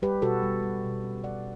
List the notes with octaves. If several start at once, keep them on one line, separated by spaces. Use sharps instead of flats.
G3 G4 B4
B2 F#4 A4
G3
G3
B2
C#4
G3 D5 F#5